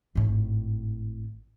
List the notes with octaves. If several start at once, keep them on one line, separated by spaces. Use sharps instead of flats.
G#1 A2